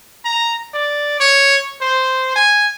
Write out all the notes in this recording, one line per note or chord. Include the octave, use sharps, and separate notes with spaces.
A#5
D5
C#5
C5
G#5